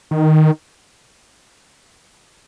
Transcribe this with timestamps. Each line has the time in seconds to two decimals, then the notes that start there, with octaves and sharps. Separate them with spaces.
0.11 D#3